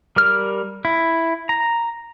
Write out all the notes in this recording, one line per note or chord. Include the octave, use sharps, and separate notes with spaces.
G3 A#4 F6
E4
A#5